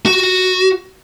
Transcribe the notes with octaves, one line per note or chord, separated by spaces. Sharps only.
F#4